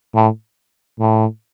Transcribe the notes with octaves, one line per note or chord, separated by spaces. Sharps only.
A2
A2